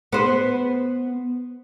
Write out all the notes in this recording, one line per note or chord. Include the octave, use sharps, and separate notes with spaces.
B3 C5